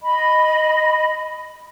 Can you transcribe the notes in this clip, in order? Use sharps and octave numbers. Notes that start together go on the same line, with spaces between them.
D#5 B5